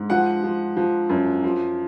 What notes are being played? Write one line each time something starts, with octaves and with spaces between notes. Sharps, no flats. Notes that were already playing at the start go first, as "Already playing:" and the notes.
Already playing: G#2
F3 F#5
F3
F3
F#2
F3